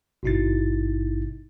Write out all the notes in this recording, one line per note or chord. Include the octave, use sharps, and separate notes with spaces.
G#1 G2 B2 D#4 E4 A6